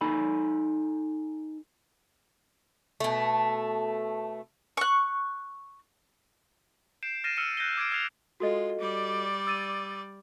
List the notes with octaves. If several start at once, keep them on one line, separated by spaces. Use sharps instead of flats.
D#4 A4 G#5 B5
B2 A3
C#6 F#6
G6 C7 D7 E7
F6 A6 A#6 C7 D#7 E7
E6 F6 C#7 D#7
F#6 G6 A#6 D#7 G7
D6 G#6 C7 D7
D#6 F6 G#6 C7 F7
G#3 F4 F#4 A4 D#5
G3 D5
E6 A6 D#7